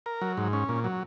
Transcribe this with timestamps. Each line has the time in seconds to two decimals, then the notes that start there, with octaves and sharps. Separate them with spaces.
0.06 A#4
0.22 F#3
0.37 G#2
0.53 C#4
0.69 A#2
0.84 F#3